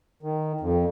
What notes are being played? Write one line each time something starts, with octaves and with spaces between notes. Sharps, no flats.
D#3
F2